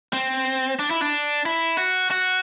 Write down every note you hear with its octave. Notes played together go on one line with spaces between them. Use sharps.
C4
D4
E4
D4
E4
F#4
F#4